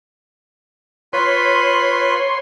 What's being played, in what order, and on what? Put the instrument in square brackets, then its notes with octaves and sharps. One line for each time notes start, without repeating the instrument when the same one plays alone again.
[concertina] F4 B4 B5 [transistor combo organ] C#5 C6